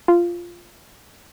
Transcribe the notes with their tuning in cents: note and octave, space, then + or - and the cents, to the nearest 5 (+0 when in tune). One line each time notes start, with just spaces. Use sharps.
F4 -10